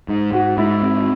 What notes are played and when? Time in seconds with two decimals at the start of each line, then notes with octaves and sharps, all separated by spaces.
0.08 G#2
0.32 G#2 F#4
0.57 G#2 E4
0.83 C4